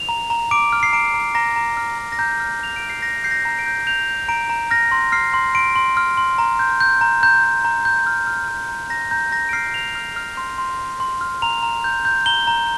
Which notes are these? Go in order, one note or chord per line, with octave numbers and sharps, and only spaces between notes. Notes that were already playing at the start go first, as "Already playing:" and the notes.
Already playing: F7
A#5
A#5
D6 D7
F6
C7
A#5 D7
A#5
A#5 A#6
A#5
F6
A#5
A#6
A#5 G6
F6
A#5 F7
D7
F6
C7
A#5 A#6
G6 C7
A#6
A#5
D7
G6
G6 F7
G6
A#5 D7
A#5
F6 A#6
C6
F6 C7
C6
C6 D7
C6
F6
C6
A#5
G6
G6
A#5
A#5 G6
G6
A#5
G6
F6
F6
F6
A#5
A#5 A#6
A#5 G6
A#5 A#6
D7
F6 C7
F6 F7
F6
F6
C6
C6
C6
C6
F6
A#5 F7
A#5
G6
G6
A#5 G7
A#5